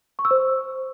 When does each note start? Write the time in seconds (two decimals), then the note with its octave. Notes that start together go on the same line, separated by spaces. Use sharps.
0.19 C#6
0.25 E6
0.31 C5